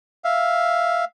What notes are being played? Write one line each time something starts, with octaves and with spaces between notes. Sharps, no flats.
E5 F5